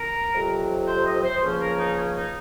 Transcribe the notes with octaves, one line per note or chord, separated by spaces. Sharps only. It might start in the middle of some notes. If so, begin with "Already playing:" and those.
Already playing: A#4
F2 C3 F#3
C5
D#5
C5
C#2 C#3 F3 A#3 C#4 C5
A#4
D#4
C#4
D#4